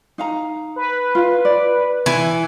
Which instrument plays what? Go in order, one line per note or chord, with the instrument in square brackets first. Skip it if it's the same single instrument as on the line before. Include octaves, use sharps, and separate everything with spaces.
[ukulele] D#4 F5 A#5
[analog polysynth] B4
[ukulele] F4 F5
D5
[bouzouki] E3 [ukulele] B4